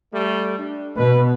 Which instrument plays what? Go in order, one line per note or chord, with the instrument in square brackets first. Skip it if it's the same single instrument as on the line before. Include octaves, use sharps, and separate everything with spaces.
[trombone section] G3 A3
D4
[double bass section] B2 [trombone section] B4